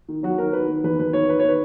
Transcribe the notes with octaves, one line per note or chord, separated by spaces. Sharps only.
D#3
F#3 F#4
D#3 A#4
D#3 B4
D#3
E2 B4
E2 B4
D#3 C#5
D#3 B4
D#3 C#5
B4